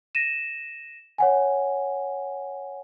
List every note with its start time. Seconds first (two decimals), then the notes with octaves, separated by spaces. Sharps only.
0.15 A#6 D#7 E7
1.18 C#5 F#5 G#5